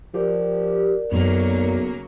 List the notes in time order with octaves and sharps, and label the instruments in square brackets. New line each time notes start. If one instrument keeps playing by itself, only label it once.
[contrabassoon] F3 [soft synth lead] G4 [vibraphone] A#4 D5
[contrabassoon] B1 [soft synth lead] F#2 [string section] C#3 F#3 A#3